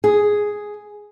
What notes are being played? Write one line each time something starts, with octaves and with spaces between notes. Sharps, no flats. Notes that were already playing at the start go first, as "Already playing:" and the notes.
G#4